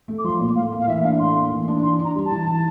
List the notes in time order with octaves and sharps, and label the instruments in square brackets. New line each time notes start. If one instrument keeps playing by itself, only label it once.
[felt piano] A3
[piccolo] D6
[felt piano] F3 [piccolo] C6
[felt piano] A#2
[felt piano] A2 [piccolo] F5
[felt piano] A#3
[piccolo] F5
[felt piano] E3 [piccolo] E5
[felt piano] D4 [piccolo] F5
[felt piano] A2 [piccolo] C6
[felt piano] A#3
E3
D4
[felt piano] E3 [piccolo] C6
[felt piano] D4
[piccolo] A#5
[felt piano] G3
[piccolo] A5
[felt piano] E3
E3